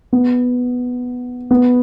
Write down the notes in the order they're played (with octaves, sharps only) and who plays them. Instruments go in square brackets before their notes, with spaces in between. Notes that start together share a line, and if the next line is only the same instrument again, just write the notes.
[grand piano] B3
B3